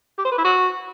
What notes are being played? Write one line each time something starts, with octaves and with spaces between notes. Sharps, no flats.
G4
C5
B4
E4
F#4